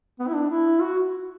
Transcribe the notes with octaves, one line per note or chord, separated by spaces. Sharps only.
B3
E4
D4
E4
F#4